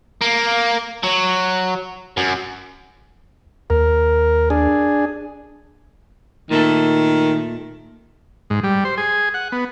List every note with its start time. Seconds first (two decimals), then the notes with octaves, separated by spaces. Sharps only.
0.21 A#3
1.03 F#3
2.17 F#2
3.70 D#2 A#4
4.50 D4 G#4
6.51 A#2 D#3 A3 A4
8.50 G#2
8.64 G3
8.85 C5
8.98 G#4
9.34 F#5
9.52 B3